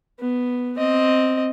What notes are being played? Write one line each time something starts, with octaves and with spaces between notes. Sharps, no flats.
B3
C4 D#5